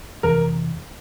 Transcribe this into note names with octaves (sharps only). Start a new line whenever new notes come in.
F2 C3 E3 A#4